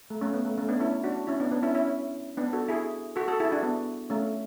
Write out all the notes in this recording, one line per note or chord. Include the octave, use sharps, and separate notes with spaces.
A3
A3 C#4
B3
A3
A3 C#4
B3 D4
C#4 E4
D4 F#4
C#4 E4
B3 D4
B3 D4
C#4 E4
C#4 E4
B3 D4
F#4 A4
E4 G#4
F#4 A4
F#4 A4
E4 G#4
D4 F#4
B3
A3 C#4